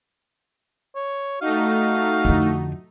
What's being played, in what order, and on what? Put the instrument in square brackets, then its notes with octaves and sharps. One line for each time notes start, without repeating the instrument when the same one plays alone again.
[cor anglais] C#5
[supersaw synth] A3 D#4 [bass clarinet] F#4 [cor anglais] F5
[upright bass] F2 D3